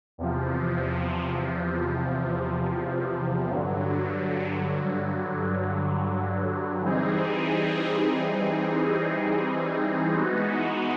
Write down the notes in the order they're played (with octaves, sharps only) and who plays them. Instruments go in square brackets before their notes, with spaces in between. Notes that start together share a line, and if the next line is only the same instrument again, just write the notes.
[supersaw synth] E2 C3 F3
G2 D3 F#3
E3 G3 C4 D#4 G#4
E3 G#3 B3 D#4 F#4